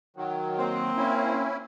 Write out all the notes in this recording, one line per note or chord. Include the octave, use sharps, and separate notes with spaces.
D#3 F#3
A#3 C4
C#4 E4